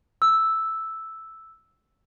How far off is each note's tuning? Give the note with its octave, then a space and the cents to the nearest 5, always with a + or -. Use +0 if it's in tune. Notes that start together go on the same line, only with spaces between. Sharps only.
E6 -5